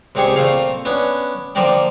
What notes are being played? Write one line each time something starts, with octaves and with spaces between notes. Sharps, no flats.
C#2 A#2 C4 G4 G#4 C#6
A#2 A3 C4 F5
B3 C#4 D4
D3 F3 A#3 A#4 D5 G5